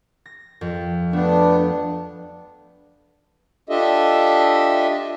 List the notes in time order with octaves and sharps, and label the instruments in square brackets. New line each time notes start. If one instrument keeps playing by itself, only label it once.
[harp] A#6
F2
[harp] A3 [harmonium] B3 D4
[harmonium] D4 F4 G4 A4 D#5 E5